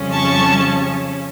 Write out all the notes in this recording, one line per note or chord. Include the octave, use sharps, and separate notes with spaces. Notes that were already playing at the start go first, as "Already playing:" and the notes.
Already playing: F2 C#3 G3 C#4
A5 C#6